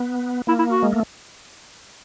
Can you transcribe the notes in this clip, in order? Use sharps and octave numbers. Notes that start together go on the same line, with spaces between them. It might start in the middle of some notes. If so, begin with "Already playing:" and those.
Already playing: B3
A#3 E4
E4
F#4
G#3
A3